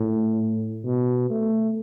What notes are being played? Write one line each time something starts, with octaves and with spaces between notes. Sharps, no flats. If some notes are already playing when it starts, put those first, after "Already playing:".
Already playing: A2
B2
A3